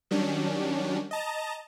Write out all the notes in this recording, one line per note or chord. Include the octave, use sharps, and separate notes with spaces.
D#3 F#3 G3 C#4 D4
D#5 A5 A#5